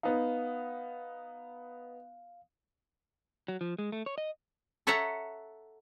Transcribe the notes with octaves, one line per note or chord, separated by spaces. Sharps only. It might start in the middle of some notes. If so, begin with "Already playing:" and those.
B3 D#4 F5
F#3
F3
G#3
A3
C#5
D#5
A4 C#5 E5 F#5 A5 A#5